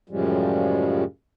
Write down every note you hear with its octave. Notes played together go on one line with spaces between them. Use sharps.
F#2 A2 C#3 F3 G3 G#3